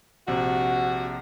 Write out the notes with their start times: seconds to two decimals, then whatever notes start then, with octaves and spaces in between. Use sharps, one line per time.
0.28 A#1 C3 F#4